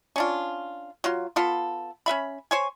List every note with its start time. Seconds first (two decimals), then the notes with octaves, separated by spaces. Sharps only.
0.16 C#4 D4 F4
1.04 F#3 F4
1.36 B3 F4 A4
2.06 C#4 B4 E5 B5
2.51 C5 C#5 G#5